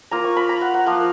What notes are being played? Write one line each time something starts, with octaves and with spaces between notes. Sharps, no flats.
A#3 F4 A#5
C#6
B5
A#5
F#5
F#5
F3 A#3 F4 F5